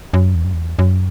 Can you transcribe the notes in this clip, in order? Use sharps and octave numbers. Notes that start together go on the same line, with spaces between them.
F#2
E2
F#2
E2
F#2